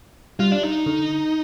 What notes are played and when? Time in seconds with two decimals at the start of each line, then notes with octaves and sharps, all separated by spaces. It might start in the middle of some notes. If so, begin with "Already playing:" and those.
0.39 G3 F4
0.52 D4
0.63 D#4
0.86 D3